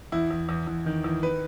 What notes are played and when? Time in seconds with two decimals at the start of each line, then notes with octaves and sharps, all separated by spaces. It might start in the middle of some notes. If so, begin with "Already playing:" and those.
0.12 E2 E4
0.31 E2
0.49 E2
0.67 E2
0.86 D#3
1.04 E2
1.23 B4